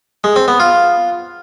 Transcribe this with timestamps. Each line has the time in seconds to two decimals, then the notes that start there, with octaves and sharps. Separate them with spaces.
0.24 G#3
0.36 C4
0.48 B3
0.60 F4